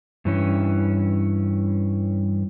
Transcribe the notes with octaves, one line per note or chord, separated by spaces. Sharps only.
G2 E3 C#4